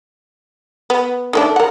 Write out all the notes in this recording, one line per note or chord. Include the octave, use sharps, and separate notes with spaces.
B3
D#3 A3 D4
A#4 F#5